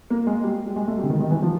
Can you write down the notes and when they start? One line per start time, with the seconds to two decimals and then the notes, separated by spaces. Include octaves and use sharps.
0.10 A#3
0.27 G#3
0.44 G3
0.66 G3
0.76 G#3
0.88 A3
0.98 G3
1.03 D3
1.10 D#3
1.20 D#3
1.31 E3
1.42 F3